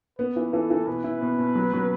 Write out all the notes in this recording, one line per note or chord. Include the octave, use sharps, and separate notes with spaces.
B3 B4
E3
E3 A4
E3
B2 B4
E4
B2
B2
F#3
F#3